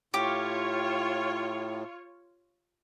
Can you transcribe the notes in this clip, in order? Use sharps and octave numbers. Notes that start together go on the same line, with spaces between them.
A2 F4 G4 C#5